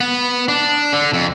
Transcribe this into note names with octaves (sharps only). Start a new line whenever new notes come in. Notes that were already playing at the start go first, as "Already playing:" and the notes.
B3
D4
D3
F2